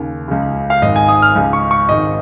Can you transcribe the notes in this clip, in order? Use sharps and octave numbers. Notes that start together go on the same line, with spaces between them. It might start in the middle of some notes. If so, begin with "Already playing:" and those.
Already playing: D#2 C#3
C#2 C#3
F5
G#1 G#2 D#3 D#5
G#5
D#6
F6
C#2 C#3
C#6
C#6
G#1 G#2 D#3 D#5